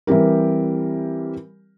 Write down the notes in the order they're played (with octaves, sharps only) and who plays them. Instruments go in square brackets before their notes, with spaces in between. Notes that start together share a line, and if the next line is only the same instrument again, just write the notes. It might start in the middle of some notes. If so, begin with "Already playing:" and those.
[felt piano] E3 G3 C4 G4 A#4